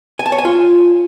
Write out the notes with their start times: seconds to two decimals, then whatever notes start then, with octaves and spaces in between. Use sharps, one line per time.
0.19 G#5
0.26 A5
0.32 C#5
0.38 G#5
0.45 F4